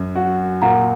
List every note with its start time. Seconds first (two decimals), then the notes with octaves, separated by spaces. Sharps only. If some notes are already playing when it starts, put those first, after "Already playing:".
Already playing: F#2
0.16 F#4
0.62 A#2 F#5 A#5